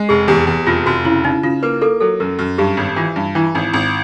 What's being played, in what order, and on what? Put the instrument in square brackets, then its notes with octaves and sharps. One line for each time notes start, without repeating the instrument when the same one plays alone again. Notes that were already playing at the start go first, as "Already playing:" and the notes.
Already playing: [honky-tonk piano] G#3
[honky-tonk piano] F1 [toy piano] G#4
[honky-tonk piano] E2 [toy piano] G4
[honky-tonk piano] E2
[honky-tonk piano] F1 [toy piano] F4
[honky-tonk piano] F1 [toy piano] F#4
[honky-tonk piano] C#3 [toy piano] E4
[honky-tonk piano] C#3 [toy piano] D#4
[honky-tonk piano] C#3 [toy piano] F4
[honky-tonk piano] A#3 [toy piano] B4
[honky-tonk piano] A#3 [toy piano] A4
[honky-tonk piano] F#3 [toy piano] A4
[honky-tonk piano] F#2 [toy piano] A#4
[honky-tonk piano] F#2
[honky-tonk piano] G2 [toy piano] G4
[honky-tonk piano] G#1
[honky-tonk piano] E3 [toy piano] F4
[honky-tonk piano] G2
[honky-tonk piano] E3 [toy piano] E4
[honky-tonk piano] G#1 [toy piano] D#4
[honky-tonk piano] G#1